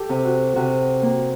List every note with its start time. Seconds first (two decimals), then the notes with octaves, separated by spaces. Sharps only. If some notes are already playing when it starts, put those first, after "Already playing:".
Already playing: G4 A4
0.09 C3
0.25 F#4
0.56 C3 F#4
1.02 A#3 G4